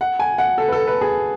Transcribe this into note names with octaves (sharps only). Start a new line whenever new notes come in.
F#5
G#5
F#5
A4
B4
A4
B4
G#4